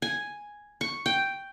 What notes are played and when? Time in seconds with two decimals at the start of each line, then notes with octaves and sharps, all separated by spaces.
0.02 G#5
0.81 C#6
1.06 G5